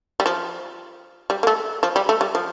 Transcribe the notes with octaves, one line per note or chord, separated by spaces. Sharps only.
G3
F3
G3
A#3
A3
F3
G3
A3
G3
F3